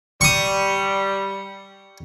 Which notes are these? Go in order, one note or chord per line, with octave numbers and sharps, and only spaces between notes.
G3 C#6 D#6